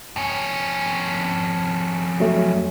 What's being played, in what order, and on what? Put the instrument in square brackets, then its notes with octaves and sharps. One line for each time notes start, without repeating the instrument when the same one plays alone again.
[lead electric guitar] F2 C#4
[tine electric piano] F#3 A3